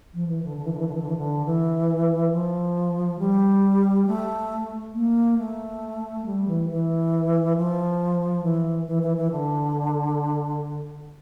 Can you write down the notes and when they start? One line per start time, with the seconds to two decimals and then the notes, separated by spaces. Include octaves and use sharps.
0.14 F3
0.28 E3
0.43 D3
0.57 D3
0.65 E3
0.73 D3
0.79 E3
0.88 D3
0.95 E3
1.02 D3
1.09 E3
1.17 D3
1.45 E3
2.32 F3
3.19 G3
4.07 A3
4.94 A#3
5.38 A3
6.26 G3
6.48 E3
6.70 E3
7.56 F3
8.44 E3
8.88 E3
9.03 E3
9.17 E3
9.31 D3